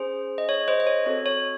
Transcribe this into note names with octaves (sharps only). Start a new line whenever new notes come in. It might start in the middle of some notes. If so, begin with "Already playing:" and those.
Already playing: C#4 G#4 C5
D#5
C#5
C5 D#5
D#5
C#5
C4 F#4 A4 C#5
C#5